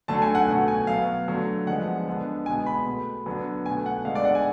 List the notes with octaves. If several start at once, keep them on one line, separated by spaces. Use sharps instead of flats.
D3 F#3 A3 A5
G#5
F#5
B2 F#3 A3
G#5
B2 F#3 B3 F5
D3 F#3 A3
D3 F3 G#3 B3 F#5
D3 G#3 B3
B2 G#3 B3 G#5
B5
B2 A3
D3 F#3 B3
B2 A3 G#5
F#5
D3 G#3 B3 F5
D5
F#5
G#5